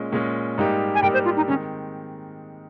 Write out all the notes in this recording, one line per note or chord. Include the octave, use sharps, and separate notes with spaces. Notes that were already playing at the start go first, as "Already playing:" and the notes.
Already playing: A#2 G#3 C#4
A#2 G#3 C#4
G#2 G3 A#3 D#4 G4
G#5
G#2 G3 A#3 D#4 G4 G5
C5
F4
D#4
D#3 G#3 C4 C#4